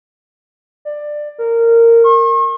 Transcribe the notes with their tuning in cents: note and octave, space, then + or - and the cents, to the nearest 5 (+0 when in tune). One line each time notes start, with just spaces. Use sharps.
D5 +15
A#4 -15
C#6 -45